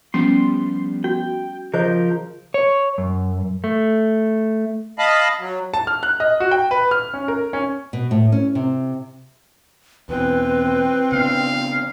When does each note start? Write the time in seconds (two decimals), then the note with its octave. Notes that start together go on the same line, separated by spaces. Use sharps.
0.14 F3 G3 B3 C#4 C6
1.04 F#4 G5
1.74 C#3 F3 G#4 A#4 C5 D#5 G6
2.54 C#5
2.98 F#2
3.64 A3
4.99 D#5 F5 A5 B5
5.40 F#3
5.74 A5
5.87 F6
6.03 F#6
6.20 D#5
6.40 F#4
6.51 G5
6.71 B4
6.91 F6
7.14 C#4
7.28 A#4
7.53 C#4
7.93 B2
8.11 A2
8.32 C#4
8.55 C3
10.09 E2 B2 C4 B4 G5
11.12 C#3 B3 D4 F5